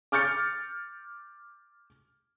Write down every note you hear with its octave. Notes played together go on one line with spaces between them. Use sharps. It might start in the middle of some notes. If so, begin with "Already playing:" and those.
D6 F6 G6 A6 C#7